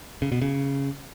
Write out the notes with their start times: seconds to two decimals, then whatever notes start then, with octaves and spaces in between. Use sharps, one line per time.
0.22 C#3
0.32 B2
0.42 C#3